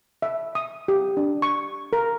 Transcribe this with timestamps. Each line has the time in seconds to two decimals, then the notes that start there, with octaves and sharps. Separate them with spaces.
0.22 E5
0.55 D#6
0.88 G4
1.17 D4
1.42 C#6
1.93 A#4